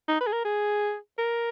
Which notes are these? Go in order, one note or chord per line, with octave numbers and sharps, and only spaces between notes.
D#4
B4
G#4
A#4
G#4
A#4